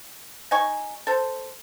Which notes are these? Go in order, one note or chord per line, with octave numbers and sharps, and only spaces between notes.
D#4 G#5 C#6
A4 C5